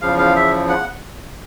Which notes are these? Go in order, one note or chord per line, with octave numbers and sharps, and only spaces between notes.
E2 C#3 F3 F5
F5
E5
F#5